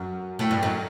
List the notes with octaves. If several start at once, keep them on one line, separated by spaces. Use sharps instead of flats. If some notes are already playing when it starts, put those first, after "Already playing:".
Already playing: F#2
A2
G2
F#2